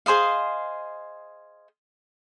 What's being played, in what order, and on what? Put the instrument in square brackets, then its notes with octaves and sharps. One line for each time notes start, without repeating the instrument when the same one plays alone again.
[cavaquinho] G#4 C5 D#5 F5